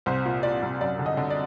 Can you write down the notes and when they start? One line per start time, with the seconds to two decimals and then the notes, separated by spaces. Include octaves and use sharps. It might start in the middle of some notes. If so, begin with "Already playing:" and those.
0.06 C2 C5
0.25 A#2
0.43 A#2 D5
0.62 C2
0.81 F#2 D5
0.99 D3
1.06 D#5
1.17 D3
1.30 D5